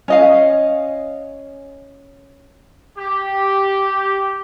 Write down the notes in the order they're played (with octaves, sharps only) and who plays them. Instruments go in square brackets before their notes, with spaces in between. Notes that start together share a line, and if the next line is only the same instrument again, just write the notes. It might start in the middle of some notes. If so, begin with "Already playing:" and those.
[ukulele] C#4 D#5 F5
[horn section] G4